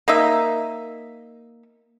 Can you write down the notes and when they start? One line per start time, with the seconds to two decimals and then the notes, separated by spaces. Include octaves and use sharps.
0.08 A#3 D#4 E5